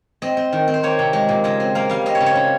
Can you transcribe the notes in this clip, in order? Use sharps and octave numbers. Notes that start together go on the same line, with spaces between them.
C4 D#5
C4
D#3
C4
C5
A#3 C#5
C3
G#3
A#2
C#3 D#5
C4
A#3 F5
G3 F5
C4 D#5
C#5
C#3
C#5
C#3